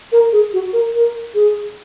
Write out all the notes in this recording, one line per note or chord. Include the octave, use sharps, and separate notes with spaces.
A#4
G#4
F#4
A#4
A#4
G#4